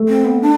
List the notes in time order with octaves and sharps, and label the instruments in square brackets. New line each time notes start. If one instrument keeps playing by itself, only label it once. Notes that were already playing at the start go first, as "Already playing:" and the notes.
Already playing: [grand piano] A3
[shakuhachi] C4
B3
D4